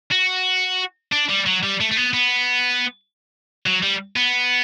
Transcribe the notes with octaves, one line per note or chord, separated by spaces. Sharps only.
F#4
D4
G3
F#3
G3
A3
A3
B3
B3
F#3
G3
B3